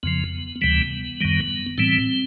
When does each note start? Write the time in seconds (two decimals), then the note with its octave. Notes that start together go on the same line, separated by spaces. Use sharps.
0.03 F2 C#3 F3 B3
0.61 D2 C3 E3 G3 B3
1.21 F#2 D#3 G3
1.78 A2 E3 G3 C4